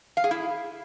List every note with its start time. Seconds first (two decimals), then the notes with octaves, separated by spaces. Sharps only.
0.17 F5
0.24 G#4
0.31 E4